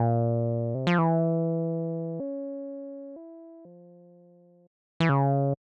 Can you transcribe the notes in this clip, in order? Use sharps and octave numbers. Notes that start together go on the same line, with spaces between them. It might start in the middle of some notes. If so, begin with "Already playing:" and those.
Already playing: A#2
C3
F3
E3
C#4
E4
F3
E3
C#3